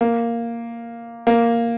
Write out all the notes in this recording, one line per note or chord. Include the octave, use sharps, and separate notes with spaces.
A#3
A#3